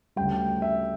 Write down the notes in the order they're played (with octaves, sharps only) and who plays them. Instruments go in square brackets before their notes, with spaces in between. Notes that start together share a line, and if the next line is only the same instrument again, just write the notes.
[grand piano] D2 C#3 G3 G5
E5